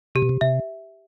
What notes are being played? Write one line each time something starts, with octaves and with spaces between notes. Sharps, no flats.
C3 G4
B2
C3
C3 E5